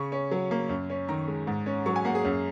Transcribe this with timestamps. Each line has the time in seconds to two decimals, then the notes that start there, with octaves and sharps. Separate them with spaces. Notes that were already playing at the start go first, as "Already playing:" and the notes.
Already playing: C#3 C#4 C#6
0.12 C#4
0.31 F#3
0.51 A#3
0.69 F#2
0.90 C#4
1.08 D#3 A#5
1.28 G#3
1.47 G#2
1.66 C#4
1.86 F#3 C#6
1.96 G#5
2.05 A#3 F#5
2.15 G#4
2.25 F#2